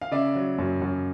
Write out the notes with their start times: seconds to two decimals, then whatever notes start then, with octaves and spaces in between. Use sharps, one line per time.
0.02 F5
0.11 C#3 D5 E5
0.35 F#3
0.58 F#2
0.82 F#2